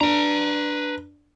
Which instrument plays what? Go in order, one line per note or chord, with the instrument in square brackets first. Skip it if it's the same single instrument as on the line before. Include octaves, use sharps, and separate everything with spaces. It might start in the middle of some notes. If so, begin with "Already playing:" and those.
[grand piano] D4 [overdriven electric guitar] B4 A#5